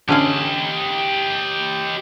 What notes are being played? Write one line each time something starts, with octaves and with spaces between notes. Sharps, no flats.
D3 C#4 G4 D#5 F5